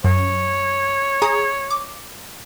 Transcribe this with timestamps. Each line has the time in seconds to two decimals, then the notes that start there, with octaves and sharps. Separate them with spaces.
0.04 F#2 C#5
1.22 G#4 A#5 D#6
1.70 D6